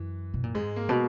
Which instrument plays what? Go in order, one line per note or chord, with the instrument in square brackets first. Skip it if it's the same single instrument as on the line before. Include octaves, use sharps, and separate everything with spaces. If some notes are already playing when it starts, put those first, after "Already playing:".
Already playing: [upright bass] F#2 [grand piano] E3
[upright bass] B2
A#2
[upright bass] G#2 [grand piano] G#3
[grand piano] A#3
[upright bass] B2